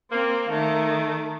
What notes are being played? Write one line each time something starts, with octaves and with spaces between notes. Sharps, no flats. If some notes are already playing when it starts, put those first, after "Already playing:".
A#3 C4
D#3 A3